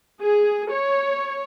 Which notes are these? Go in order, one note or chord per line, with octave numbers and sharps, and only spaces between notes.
G#4
C#5